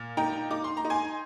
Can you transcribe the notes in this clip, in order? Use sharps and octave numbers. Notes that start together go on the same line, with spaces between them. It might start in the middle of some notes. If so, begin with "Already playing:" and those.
Already playing: A#2
D#4 G5 A#5
D#4 D6
C6
A#5
D#4
G#5 C6